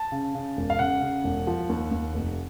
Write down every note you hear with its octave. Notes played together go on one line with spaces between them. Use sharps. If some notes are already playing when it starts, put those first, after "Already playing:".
Already playing: A5
C#3
C#3
E1
F5
C#3 F#5
C#3
E1
F3
D#2
D#2
F1